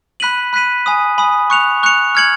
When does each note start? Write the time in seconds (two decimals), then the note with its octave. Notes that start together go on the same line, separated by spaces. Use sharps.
0.20 B5 F#6 B6 D#7 F#7
0.53 B5 F#6 B6 D#7 F#7
0.86 G#5 B5 D#6
1.18 G#5 B5 D#6
1.50 C#6 F#6 C#7 F7
1.83 C#6 F#6 C#7 F7
2.15 F6 G#6 C#7 F#7